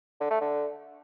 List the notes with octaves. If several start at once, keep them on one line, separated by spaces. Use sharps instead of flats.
D3
A3
D3